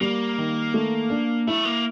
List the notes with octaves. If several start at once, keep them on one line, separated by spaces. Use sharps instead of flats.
G3 A#3
D#3
A3
D4
A3 E4
A#3